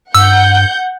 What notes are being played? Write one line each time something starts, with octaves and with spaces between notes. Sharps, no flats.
G2 F#5 E6 G6